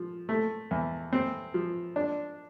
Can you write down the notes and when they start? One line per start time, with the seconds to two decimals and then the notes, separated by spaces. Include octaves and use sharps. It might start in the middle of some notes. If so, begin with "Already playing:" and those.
Already playing: F3
0.29 A3
0.71 E2
1.13 C4
1.54 F3
1.96 D4